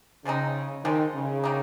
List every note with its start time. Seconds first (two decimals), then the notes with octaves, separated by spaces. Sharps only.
0.25 C#3 F3 G#3 C4 D#4
0.84 D#3 F3 G#3 C4 D#4
1.14 C#3
1.44 D#3 A#3 D#4